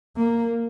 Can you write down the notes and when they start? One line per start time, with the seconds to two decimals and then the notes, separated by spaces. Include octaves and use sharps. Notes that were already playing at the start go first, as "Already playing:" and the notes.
0.16 A#3